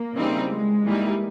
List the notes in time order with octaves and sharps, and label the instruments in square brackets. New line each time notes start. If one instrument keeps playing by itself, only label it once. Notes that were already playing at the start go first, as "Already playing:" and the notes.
Already playing: [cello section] A#3
[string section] C#3 E3 G3 C4 D#4
[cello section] G#3
[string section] E3 G3 A#3 D#4